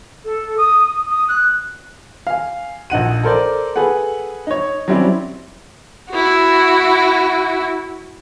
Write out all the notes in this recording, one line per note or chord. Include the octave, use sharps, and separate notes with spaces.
A4
D#6
D#6
F#6
F5 G#5
A#1 D#4 F#5 D#7
A4 A#4 C5 D5
G#4 A4 B4 F#5
D#4 C#5
F#3 G3 C4 C#4 E4 D5
E4 F#4